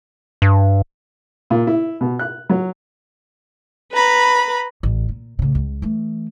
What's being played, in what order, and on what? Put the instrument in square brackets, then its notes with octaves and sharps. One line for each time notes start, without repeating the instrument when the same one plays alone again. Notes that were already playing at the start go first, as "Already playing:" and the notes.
[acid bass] G2
[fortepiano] A#2
E4
B2
F#6
F#3
[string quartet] B4 A#5 B5
[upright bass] A1
A#2
A2 C#3
C#2
E3 A3